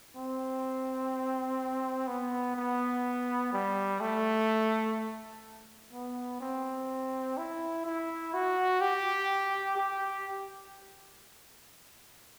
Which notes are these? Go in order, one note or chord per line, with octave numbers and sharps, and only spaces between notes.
C4
B3
B3
G3
A3
B3
C4
E4
E4
F#4
G4
G4